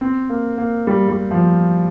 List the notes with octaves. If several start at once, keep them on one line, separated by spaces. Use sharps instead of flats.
C4
A#3
A#3
G3
G3
F3